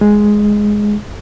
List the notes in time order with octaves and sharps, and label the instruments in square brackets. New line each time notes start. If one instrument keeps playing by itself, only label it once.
[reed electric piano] G#3